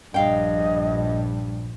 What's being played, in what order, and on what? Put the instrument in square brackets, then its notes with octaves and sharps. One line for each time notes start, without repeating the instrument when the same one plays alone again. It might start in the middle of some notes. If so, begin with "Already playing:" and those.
[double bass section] A#1 [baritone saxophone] G2 [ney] D#5 [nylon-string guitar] F5 G5